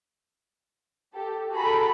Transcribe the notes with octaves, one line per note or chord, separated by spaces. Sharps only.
G4 A4
F#4 G#4 A4 A#5 B5